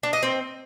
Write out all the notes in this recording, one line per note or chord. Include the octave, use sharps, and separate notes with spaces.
D4
D#5
C4